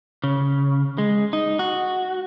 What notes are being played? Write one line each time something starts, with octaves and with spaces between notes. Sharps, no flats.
C#3
G#3
D#4
F#4